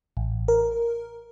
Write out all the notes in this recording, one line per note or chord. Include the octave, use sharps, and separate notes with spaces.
A1
A#4